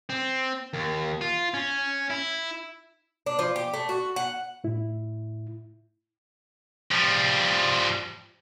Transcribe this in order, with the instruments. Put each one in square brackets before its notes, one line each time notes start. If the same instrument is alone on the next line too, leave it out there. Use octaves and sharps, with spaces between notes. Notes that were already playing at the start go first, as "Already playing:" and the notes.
[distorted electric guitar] C4
D#2
F4
C#4
E4
[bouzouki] D4
F3
G4
A3
F#4
F#5
[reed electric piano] A2 E4
[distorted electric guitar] F3 G3